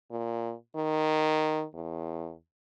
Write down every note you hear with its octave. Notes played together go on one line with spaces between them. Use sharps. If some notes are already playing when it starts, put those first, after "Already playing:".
A#2
D#3
E2